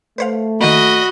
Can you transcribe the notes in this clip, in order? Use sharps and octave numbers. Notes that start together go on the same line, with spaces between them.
A3 B4 C5 F5
D#3 A#3 F#4 D#5 B5